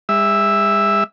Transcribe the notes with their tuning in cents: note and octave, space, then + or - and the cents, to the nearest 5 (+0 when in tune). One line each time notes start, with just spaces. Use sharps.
G#3 -45 E5 +0